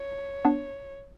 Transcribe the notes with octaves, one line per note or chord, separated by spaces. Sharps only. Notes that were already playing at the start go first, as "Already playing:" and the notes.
Already playing: C#5
B3 D4